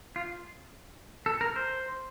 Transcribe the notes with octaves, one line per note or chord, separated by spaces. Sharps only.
F4
A4
A#4
C5